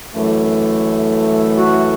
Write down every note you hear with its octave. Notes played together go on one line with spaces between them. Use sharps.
F#2 E3 A3
F#4